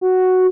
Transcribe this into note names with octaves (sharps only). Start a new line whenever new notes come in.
F#4